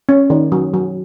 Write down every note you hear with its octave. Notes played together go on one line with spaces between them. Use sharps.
C#4
D#3
F#3
F#3